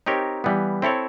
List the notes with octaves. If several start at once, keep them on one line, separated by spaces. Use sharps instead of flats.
C4 D#4 G4 A#4 C#5
E3 G3 B3
C4 E4 A4 C#5